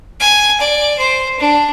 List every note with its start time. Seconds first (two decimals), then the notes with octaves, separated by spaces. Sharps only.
0.20 G#5
0.60 D5
0.99 C5
1.40 D4